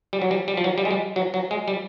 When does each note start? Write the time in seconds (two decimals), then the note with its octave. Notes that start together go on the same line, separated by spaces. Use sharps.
0.13 G3
0.22 F#3
0.31 G3
0.48 G3
0.57 F3
0.64 F#3
0.78 G3
0.85 G#3
0.91 G3
1.16 F#3
1.34 F#3
1.51 G#3
1.68 G3